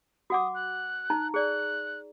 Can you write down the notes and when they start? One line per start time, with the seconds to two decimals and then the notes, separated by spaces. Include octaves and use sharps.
0.30 F#4 F#5 D6 D#6
0.55 F#6
1.10 D#4 A#5
1.34 G#4 D5 F#6